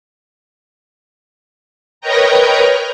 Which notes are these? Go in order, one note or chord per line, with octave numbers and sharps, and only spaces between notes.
A#4 B4 C#5 D#5 G5 A#5